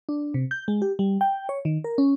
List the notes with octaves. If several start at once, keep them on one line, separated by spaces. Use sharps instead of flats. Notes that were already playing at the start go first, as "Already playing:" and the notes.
D4
C3
G6
G#3
G4
G3
G5
C#5
D#3
A#4
C#4